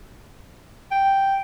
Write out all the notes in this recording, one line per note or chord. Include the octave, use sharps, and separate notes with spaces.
G5